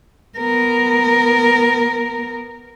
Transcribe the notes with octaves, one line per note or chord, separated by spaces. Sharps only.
B3 A#4